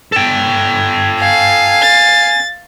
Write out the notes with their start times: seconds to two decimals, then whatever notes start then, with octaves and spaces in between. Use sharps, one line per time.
0.12 A4 G5
1.21 F5 G#5
1.82 A6